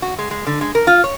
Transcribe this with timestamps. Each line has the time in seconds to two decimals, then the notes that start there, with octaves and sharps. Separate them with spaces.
0.02 F#4
0.19 G#3
0.31 G#3
0.47 D3
0.61 G#3
0.75 A#4
0.87 F4
1.04 C#5